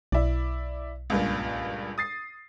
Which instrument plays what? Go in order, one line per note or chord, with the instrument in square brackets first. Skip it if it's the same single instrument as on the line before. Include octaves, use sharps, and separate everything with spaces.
[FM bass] B1 [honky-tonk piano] E4 D5
[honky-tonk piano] C#2 G2 A#2
D#6 A6 C7